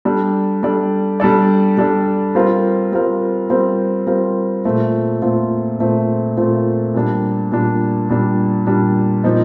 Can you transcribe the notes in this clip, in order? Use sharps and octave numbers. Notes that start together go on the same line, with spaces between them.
G3 D4 A4 D5
G3 D4 A4 D5
G3 D4 A4 D5
G3 D4 A4 D5
G3 C4 F4 A#4
G3 C4 F4 A#4
G3 C4 F4 A#4
G3 C4 F4 A#4
A#2 A3 C4 F4
A#2 A3 C4 F4
A#2 A3 C4 F4
A#2 A3 C4 F4
A#2 G3 D4
A#2 G3 D4
A#2 G3 D4
A#2 G3 D4
A#2 F3 C4 D#4